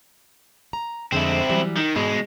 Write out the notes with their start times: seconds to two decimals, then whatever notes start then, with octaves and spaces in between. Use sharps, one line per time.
0.73 A#5
1.12 F2 D3 G#3 C4 E4
1.49 E3 F#3 G3
1.77 D#3
1.96 G#2 B2 G#3